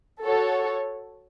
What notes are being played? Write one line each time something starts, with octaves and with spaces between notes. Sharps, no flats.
F#4 A4 C#5